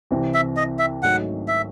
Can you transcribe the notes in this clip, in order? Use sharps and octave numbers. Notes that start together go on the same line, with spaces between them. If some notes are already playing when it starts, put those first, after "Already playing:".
C2 C3 E3 C4
E5
D#5
E5
G#1 G#2 F#3 A3 C#4 F#5
E5